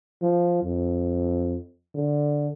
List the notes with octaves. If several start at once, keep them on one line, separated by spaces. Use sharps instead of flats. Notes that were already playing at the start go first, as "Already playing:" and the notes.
F3
F2
D3